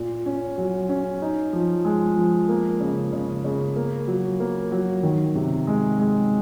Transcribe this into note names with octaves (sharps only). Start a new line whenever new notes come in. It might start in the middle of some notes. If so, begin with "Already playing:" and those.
Already playing: A#2
C#4
F#3
C#4
D#4
F3
G#3
F3
A#3
C#3
C#3
C#3
A#3
F#3
A#3
F#3
D#3
C3
G#3
G#3